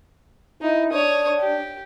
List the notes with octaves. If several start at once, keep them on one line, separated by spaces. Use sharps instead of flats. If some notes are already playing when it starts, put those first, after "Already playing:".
D#4 E4
D4 C#5 D#6
G4